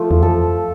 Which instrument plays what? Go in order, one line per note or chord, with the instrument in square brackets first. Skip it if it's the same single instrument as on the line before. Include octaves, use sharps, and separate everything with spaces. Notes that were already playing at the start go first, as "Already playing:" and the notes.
Already playing: [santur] F3 A3
[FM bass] E2
[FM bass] F2 [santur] A4